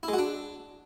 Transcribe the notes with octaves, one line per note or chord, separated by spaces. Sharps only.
E4
G#3
F#4
D4